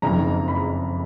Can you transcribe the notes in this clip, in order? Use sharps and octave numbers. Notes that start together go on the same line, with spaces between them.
F#1 F2 D#3 A#5
B5